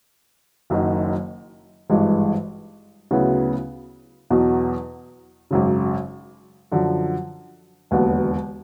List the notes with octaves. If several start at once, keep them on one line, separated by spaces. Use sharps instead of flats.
F#1 F#2 D#3 F#3
G#1 G2 E3 G#3
D2 C#3 F#3 B3 E4
E2 B2 F#3
G#1 F#2 C#3
F#2 D3 F3
E1 D#2 D3 F#3 B3